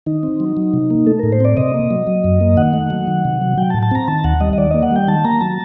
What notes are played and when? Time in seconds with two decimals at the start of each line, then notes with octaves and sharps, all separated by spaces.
0.06 D#3 D#4
0.23 C4
0.40 F#3
0.57 F#3
0.74 C3
0.90 A#3
1.07 A3 A4
1.19 A2 A#4
1.32 C5
1.40 C4 D5
1.57 C3 D#5
1.74 A#3
1.91 F#3
2.07 F#3
2.24 F#2
2.41 A#3
2.57 D#3 F#5
2.73 A3
2.90 F#3
3.07 D#3
3.25 C3
3.41 F#3
3.57 F#3 G5
3.70 A5
3.74 A2
3.83 A5
3.91 C4 A#5
4.08 D#3 A5
4.24 D#2 F#5
4.41 G3 D#5
4.53 D#5
4.58 D#3 D5
4.71 A#3 D#5
4.83 F#5
4.91 G3 G5
5.08 D#3 A5
5.24 A#3 A#5
5.41 F#3 A5